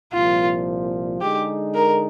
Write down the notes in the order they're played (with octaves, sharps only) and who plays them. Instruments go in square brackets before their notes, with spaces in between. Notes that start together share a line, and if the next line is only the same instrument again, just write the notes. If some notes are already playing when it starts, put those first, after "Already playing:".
[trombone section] C2 A#2 F3 [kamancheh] F4
[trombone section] D3 G#3 D#4 G#4 [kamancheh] G4
[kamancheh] A#4